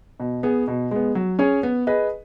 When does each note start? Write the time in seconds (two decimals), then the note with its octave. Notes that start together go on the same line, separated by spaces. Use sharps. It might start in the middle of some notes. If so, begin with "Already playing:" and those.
0.20 B2
0.43 B3 G#4
0.68 B2
0.91 G#3 B3
1.15 F#3
1.39 C#4 G#4 C#5
1.63 B3
1.87 G#4 B4 D#5